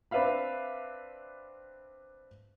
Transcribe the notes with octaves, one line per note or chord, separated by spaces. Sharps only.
C4 D4 B4 E5 F5 B5